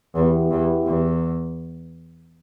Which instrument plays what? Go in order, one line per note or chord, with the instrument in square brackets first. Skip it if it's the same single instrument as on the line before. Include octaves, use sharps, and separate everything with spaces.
[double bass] E2 [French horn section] E3 B3 E4 G4
[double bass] E2
E2